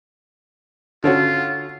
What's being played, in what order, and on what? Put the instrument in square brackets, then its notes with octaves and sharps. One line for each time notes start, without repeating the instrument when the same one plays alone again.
[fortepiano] D3 C#4 F#4 [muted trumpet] F4